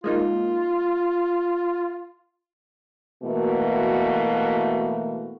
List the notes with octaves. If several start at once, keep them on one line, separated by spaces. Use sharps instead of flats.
G#3 A#3 D#4 F4
B2 E3 A3 A#3 F#4